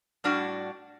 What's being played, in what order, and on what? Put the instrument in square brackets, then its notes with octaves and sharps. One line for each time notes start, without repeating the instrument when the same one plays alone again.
[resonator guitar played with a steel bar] A2 G3 D4 F#4 F#5